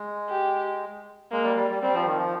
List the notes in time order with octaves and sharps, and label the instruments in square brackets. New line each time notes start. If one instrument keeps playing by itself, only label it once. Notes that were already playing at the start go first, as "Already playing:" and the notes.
Already playing: [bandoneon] G#3
[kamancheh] G4
[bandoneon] G#3 [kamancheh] A#3
[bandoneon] G3
G3
G3
[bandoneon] G3 [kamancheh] C4
[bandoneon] F3
D#3
F3